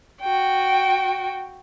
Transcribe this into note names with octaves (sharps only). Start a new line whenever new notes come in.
F#4 G5